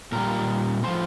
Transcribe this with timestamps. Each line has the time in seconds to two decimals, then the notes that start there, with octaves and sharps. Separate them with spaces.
0.12 A#2 G3 A#4
0.83 A2 F3 C5